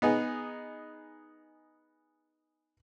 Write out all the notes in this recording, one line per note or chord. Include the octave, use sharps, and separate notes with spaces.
B3 D#4 G#4